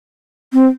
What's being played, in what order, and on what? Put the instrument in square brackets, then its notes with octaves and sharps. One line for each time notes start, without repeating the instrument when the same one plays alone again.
[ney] C4